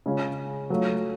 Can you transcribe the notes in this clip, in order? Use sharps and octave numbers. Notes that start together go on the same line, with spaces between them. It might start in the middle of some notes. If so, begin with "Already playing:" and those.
C#3 G#3 C#4 F4
F#3 A3 F4